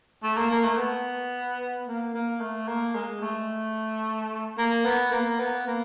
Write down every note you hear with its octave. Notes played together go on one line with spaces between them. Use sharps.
A3
A#3
A#3
A3
B3
A#3
A#3
A3
A#3
G#3
A3
A#3
B3
A#3
B3
A#3